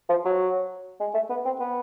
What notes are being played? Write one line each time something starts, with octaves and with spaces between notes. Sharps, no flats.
F3
F#3
G#3
A3
B3
C4
B3